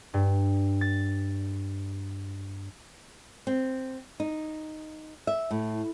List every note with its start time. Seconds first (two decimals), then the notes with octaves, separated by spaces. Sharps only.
0.14 G2
0.81 A6
3.47 C4
4.20 D#4
5.27 E5
5.51 A2